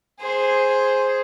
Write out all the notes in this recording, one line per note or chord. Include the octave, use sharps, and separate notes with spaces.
G#4 C5